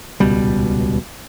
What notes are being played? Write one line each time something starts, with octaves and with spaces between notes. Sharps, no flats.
D#1 C#2 B2 G3